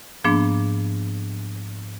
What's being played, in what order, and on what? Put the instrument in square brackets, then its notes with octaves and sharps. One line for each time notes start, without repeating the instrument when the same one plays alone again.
[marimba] G#2 F3 A#3 B3 D4